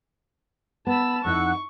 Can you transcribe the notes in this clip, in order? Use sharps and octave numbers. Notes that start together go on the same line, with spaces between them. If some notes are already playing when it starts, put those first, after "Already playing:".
B3 A5 B5 E6
F2 D#4 E4 F#5 C#6 E6 F#6